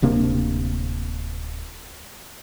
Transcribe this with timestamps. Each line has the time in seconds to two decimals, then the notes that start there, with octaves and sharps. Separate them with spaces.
0.02 D1 C3 A#3 D4